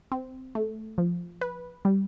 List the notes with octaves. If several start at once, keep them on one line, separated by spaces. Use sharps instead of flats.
C4
A3
F3
B4
G3